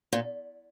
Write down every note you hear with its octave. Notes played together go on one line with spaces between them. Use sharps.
A#2